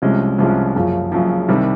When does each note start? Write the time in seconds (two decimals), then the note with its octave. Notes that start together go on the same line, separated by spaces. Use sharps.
0.02 C2 C3 F3 G#3 C#4
0.38 C2 C3 F3 G#3 C#4
0.75 F#1 F#2 C#3 F3
1.12 F#1 F#2 C#3 F3
1.48 C2 C3 D#3 G3